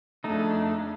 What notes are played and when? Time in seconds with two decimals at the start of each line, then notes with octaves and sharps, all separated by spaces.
0.24 F2 C#3 A3 D4 D#4